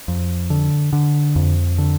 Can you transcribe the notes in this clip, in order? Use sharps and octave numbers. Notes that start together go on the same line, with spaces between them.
F2
D3
D3
F2
D3